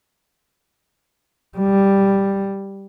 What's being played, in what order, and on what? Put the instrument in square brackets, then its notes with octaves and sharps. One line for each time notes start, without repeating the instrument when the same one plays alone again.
[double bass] G3